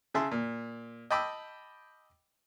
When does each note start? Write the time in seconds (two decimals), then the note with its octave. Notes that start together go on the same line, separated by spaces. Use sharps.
0.14 C#3 G#4 E5 A5 C6
0.31 A#2
1.11 D#5 G5 A5 B5 D6 E6